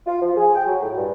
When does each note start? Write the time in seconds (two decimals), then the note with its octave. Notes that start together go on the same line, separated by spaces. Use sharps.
0.07 F4
0.22 F3
0.37 G#4
0.55 G5
0.67 F#3
0.82 A2
0.98 G2